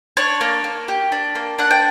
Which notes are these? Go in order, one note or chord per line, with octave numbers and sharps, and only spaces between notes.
D4 C#5
A#3
A#3
G4
D4
A#3
D4 F#5
G5